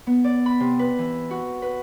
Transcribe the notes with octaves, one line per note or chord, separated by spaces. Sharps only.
B3
D5
B5
C3
B4
E3
F#4
B4